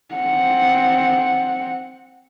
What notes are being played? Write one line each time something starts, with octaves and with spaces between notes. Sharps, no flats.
C4 F#5